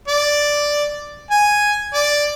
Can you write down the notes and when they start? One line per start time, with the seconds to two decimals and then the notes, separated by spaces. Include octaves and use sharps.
0.08 D5
1.31 G#5
1.94 D5